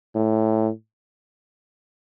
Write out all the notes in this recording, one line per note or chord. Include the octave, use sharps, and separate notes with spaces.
A2